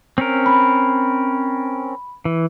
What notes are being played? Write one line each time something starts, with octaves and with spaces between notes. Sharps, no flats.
C4 C#4 A#4
B5
E3